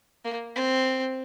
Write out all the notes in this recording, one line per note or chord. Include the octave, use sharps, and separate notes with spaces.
A#3
C4